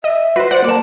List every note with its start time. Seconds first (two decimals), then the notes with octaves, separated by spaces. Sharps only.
0.04 D#5 E5
0.36 F#4 B4 C5
0.51 C5 D5 F#5 C#7
0.64 A#3 D5 A5